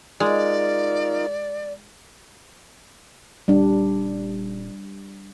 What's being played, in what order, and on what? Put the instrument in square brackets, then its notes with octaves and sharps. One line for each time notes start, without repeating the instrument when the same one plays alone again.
[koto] G#3 [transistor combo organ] D#4 F4 A#4 [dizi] D5
[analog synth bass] D#1 [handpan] G3 D4